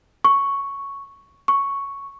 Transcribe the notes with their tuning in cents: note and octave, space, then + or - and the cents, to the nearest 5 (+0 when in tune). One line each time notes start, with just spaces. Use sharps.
C#6 +0
C#6 +0